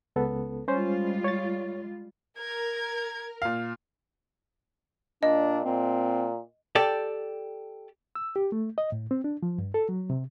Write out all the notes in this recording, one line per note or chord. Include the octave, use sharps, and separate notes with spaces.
C#2 B3 A4
G3 G#3 C#4 F4 C5
C#5 A6
A#4 G#6
A#2 F5
A#2 D4 D#5
A#2 C4
G4 A4 D5
E6
G4
A3
D#5
A2
C4
D4
F3
G2
A4
F#3
C3